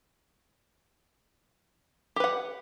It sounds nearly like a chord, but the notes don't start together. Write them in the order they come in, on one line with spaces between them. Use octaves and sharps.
G4 B4 F#5